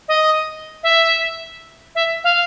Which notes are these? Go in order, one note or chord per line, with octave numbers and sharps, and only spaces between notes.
D#5
E5
E5
F5